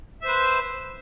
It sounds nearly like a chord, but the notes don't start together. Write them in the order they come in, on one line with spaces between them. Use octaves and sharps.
E5 C5 B4